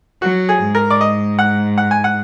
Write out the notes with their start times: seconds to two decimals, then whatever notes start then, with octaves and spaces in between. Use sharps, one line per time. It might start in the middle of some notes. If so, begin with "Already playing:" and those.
0.22 F#3 F#4
0.49 G#4
0.62 G#2
0.75 A#4
0.90 D5
1.01 D#5
1.39 F#5
1.78 F#5
1.91 G#5
2.04 F#5